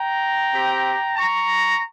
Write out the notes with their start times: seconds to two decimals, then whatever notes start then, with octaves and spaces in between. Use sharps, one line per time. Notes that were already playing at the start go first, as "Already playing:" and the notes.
Already playing: G5 A#5
0.53 C4 G4
1.16 A#5 C#6